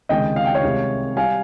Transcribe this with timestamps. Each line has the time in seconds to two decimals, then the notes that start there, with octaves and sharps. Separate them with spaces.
0.09 C#2 C3 D#3 G#3 D#5 G5
0.36 F5
0.46 G5
0.55 C#5 F5
0.64 C2 C3 D#3 G#3
1.16 G3 F5 G#5